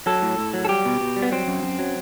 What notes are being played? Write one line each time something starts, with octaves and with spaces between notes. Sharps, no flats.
F#3 A4
A2
A2
F#3
A4
G3 G4
B2
B2
G3
B3
F#3 C4
F#2
F#2
F#3